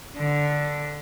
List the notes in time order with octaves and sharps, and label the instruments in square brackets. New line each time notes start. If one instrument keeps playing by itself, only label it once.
[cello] D3